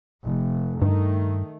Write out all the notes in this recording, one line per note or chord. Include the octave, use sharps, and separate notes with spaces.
F1
G2 D#3 A3